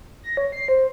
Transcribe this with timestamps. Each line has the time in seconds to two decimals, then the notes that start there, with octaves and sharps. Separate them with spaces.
0.23 A#6
0.37 C#5
0.52 C7
0.68 C5